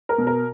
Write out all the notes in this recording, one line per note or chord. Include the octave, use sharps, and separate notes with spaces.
A#4
B2
A#4